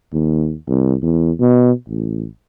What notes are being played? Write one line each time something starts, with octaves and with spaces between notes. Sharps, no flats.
D#2
C2
E2
B2
A1